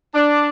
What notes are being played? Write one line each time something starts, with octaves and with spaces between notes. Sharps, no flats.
D4